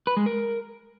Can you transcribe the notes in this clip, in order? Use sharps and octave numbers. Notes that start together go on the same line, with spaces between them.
B4
G#3
A#4